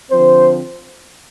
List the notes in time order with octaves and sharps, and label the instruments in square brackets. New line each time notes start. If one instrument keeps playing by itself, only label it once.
[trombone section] D3 F3 C4 C5